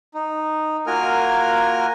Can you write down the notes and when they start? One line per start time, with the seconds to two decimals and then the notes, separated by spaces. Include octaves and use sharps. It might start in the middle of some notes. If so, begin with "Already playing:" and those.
0.14 D#4
0.87 A#3 F4 F#4 A#4 G#5 F6